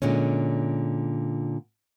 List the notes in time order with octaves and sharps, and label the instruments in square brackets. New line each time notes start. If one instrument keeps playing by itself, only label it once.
[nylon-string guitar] A#2 D3 G#3 C#4